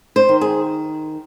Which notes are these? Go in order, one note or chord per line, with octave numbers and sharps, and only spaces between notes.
C5
D#3
G#4